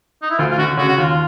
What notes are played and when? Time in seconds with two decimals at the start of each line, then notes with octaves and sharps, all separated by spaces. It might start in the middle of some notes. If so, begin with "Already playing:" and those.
0.22 D#4
0.30 E4
0.38 D2 F4
0.50 F4
0.58 D3 F#4
0.77 C#3 F#4
0.89 F#4
0.97 D#2 F4